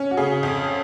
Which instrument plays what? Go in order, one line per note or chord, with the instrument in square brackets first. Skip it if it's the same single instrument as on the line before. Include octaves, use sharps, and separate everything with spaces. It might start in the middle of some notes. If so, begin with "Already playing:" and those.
Already playing: [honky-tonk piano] C#4
[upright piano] F#4
[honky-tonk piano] C#3 [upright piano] G#4
[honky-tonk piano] F2